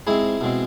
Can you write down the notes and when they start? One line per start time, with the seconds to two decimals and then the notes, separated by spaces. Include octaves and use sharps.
0.07 G#2 G#3 C4 E4 G#4
0.41 B2 G#3 C4